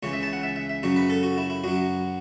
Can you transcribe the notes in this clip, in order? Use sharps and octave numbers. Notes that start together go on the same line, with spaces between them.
C#2 C#3 E3 C#5
E5
A5
F#5
E5
E5
E5
F#2 C#3 F#3 C#5
B4
A4
F#4
E4
E4
F#2 F#3 F#4